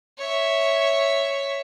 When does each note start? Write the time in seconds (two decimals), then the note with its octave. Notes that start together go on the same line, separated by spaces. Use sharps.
0.18 C#5 E5